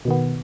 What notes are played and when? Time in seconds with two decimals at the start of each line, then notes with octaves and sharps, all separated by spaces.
0.05 B2
0.08 D#3
0.10 B3